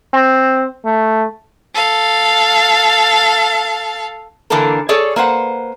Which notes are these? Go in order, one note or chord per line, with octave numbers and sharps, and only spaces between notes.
C4
A3
A4 F5
D3 E3 A#3 D4 A4 A#4
G#4 A4 C#5 D5
A#3 B4 C5 F#5